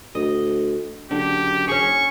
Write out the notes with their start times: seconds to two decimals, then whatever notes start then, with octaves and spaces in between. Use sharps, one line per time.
0.15 D2 D#5
1.11 F#1 D3 G4
1.68 C#4 G#4 C#6